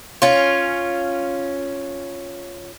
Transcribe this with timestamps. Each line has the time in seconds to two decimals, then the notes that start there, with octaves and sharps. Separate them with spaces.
0.22 C#4 F4